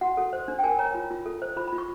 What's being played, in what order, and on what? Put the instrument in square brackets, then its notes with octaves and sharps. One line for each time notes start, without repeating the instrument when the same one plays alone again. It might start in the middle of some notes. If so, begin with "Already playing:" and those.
[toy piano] F#4 F#5
A4
C5
D4
G5
A#4 G#5
C#5 A#5
F4
F4
A4
C5
F4 B5
B5
F4
C#6